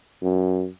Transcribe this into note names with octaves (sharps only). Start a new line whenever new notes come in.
F#2